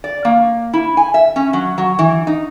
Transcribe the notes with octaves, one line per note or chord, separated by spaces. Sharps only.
D5
A#3
E4
G#5
E5
C#4
F#3
F#3
E3
D#4